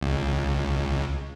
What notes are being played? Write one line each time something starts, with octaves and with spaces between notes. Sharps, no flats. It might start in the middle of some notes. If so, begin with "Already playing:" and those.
C#2